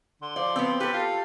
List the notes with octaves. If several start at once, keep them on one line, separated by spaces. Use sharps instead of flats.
D3 C6
F3 D5
B3 C4
G4 A4 B4
F4